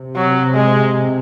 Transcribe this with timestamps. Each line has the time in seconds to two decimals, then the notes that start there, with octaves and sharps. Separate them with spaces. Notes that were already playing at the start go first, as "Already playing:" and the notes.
Already playing: C3
0.16 F#3
0.54 G#3